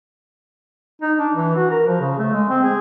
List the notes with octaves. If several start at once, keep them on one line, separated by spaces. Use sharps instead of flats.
D#4
D4
E3
F#4
A#4
F3
C#3
A3
G#3
C4
G#4